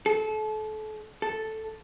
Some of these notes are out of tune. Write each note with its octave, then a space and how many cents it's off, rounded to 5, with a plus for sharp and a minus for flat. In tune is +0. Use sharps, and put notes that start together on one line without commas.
A4 -30
A4 +0